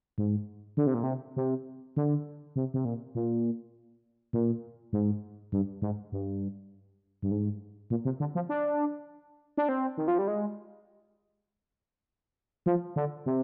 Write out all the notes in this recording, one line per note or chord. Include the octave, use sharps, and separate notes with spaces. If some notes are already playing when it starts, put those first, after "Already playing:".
G#2
D3
C3
A#2
C3
C3
D3
C3
C3
A#2
A#2
A#2
G#2
G2
G#2
G2
G2
G#2
A#2
C3
D3
F3
D4
D4
C4
D#3
F3
G3
G#3
F3
D3
C3